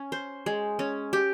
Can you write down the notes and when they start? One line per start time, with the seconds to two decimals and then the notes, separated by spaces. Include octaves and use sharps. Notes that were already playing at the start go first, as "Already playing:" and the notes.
Already playing: C#4
0.12 C5
0.46 G#3
0.79 C#4
1.13 G4